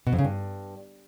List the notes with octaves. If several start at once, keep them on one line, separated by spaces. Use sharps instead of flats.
B2
F2
C#3
G2